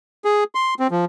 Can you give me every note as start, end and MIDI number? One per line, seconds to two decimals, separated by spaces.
0.25 0.44 68
0.55 0.74 84
0.80 0.87 60
0.91 1.05 53